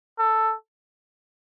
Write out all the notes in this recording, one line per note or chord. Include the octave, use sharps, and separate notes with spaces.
A4